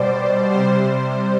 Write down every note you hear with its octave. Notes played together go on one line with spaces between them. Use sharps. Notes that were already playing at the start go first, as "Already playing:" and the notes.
Already playing: B2 G3 C5 D5
C3 G3 C5